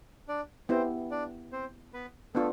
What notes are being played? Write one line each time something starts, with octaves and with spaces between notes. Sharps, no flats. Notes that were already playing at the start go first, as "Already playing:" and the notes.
D4 D5
B3 C4 E4 G4 C5
D4 D5
C4 C5
B3 B4
A3 B3 D4 F4 A4